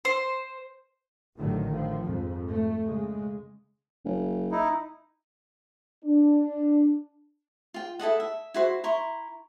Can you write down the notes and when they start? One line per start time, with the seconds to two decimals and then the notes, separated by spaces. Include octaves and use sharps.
0.05 C5
1.37 A1 A2 D3 D#3 F#3
1.69 A2 F3
2.06 F2 G#2
2.49 A3
2.85 C#3 G#3
4.05 F#1
4.52 D#4 E4
6.04 D4
7.74 F4 G5
7.99 E4 A4 D#5 F#5
8.20 E5
8.54 E4 F#4 C5
8.84 E4 A#5 C6 C#6